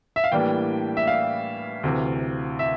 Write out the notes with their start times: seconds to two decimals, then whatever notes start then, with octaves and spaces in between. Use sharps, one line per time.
0.16 E5
0.24 F5
0.32 A2 E3 G3 A#3 D4 G5
0.97 E5
1.07 F5
1.83 D2 C3 E3
2.59 E5